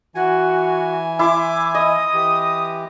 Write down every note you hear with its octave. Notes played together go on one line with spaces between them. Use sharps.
E3 F#4 G#5
E4 C6 D6
D#5 D#6
E3 G4